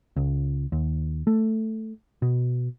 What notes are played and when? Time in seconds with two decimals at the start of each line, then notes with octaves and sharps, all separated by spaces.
0.16 C#2
0.72 D#2
1.27 A3
2.22 B2